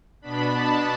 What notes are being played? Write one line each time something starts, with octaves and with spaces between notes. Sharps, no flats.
B2 B3 D4 B5
A5